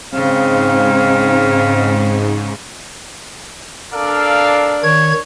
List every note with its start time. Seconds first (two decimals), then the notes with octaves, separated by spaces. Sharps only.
0.14 G#2 C#3 C4 F5
3.93 D4 A4 A#4 D5 F5
4.83 D#3 C#5 G#6